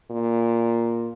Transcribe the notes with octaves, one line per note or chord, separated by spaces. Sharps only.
A#2